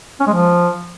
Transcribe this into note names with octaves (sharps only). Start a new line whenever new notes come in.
C#4
G#3
F3